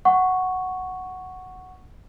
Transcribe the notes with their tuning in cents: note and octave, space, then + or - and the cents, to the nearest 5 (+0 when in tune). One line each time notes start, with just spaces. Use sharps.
F#5 +0 C#6 +0